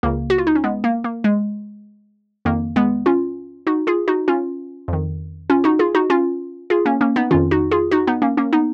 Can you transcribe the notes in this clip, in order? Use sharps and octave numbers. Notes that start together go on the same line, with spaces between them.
C#2 C#3 A#3
F#4
F4
D#4
C#4
G#3 B3
A#3
A#3
G#3
F2 D#3 A#3
G#3 B3
C#4 F4
D#4 F#4
F4 G#4
D#4 F#4
C#4 F4
F2 D#3
C#4 F4
D#4 F#4
F4 G#4
D#4 F#4
C#4 F4
F4 G#4
A#3 C#4
A#3 C#4
B3 D#4
F2 D#3 C#4 F4
D#4 F#4
F4 G#4
D#4 F#4
B3 D#4
A#3 C#4
A#3 C#4
B3 D#4